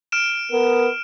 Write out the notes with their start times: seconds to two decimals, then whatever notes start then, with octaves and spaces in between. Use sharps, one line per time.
0.12 F6 D7 E7
0.51 B3 A#4